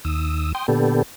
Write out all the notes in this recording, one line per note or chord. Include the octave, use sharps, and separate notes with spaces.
D#2 D#6 E6
G5 C6 D#6
A#2 D3 B3 G4 A4